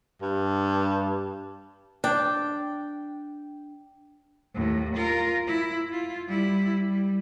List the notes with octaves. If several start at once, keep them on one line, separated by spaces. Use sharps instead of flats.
G2
D4 G5
D#2 A2
F4 A#4
E4
F4
G3 E4
G3